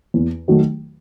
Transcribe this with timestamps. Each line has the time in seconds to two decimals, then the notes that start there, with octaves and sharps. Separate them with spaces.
0.14 E2
0.48 D#3 F#3 A3